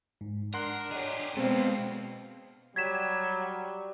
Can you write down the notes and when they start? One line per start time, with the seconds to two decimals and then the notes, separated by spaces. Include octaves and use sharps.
0.21 G#2
0.54 D4 A#4 F#5 C6 F#6
0.92 G4 G#4 C#5 D#5
1.37 B2 G#3 B3 C4 A4 F5
2.76 F#3 G3 G#6 B6 E7